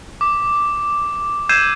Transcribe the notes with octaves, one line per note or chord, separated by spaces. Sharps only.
D6
E6 G6 G#6 C7 D#7 E7